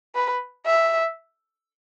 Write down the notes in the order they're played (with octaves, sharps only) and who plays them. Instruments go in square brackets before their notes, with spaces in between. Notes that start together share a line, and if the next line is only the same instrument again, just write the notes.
[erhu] B4
E5